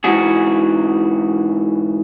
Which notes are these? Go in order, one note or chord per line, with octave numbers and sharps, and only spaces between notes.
G#2 E3 F#4 G#4